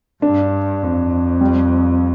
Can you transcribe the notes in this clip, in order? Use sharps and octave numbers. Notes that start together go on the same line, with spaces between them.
G2 D4
F2
G3